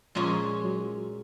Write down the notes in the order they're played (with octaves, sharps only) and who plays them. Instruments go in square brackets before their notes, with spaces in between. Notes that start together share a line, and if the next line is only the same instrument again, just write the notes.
[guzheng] A#2 G#3 C#4 G#4 [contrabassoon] F3
[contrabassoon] F#3